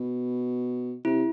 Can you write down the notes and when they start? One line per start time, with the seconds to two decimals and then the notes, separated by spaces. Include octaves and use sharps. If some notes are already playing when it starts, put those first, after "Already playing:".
Already playing: B2
1.05 C3 E4